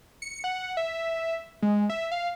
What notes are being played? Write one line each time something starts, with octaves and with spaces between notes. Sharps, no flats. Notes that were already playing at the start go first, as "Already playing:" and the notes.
C#7
F#5
E5
G#3
E5
F5